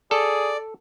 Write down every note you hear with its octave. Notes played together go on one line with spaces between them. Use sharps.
G#4 A4 D5